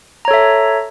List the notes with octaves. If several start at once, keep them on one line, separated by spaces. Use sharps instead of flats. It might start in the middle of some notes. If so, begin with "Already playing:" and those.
A4 C#5 E5 A#5